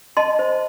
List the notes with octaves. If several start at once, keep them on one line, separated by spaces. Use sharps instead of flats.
D#5 A5 C6
C5